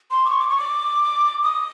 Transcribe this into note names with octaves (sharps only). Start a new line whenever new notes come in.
C6
D6
C#6
D6
C#6
D6
D#6